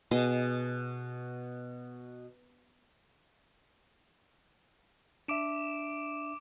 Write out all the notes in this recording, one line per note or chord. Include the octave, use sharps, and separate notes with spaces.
B2 G#4 D#5
D4 E5 D6 D7 E7